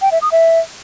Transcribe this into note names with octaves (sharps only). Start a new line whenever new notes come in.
G5
E5
D#6
E5